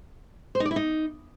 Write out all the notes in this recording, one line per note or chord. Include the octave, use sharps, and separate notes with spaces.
C5
D#4
D5
E4
D#4